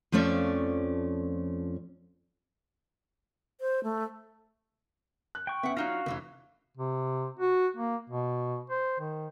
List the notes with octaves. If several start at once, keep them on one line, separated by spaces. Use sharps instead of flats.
F2 F3 A3 C#4 D5
C5
A3
F#6
G5 C#6
B3 C#4 E5 F#5
F#3 D4 D#4 F4 F#4 F5
F1 F#2 E3 F#3
C3
F#4
A#3
B2
C5
D#3